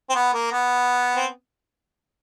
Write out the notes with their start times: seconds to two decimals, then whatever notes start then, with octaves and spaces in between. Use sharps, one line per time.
0.10 C4
0.15 B3
0.34 A#3
0.52 B3
1.16 C4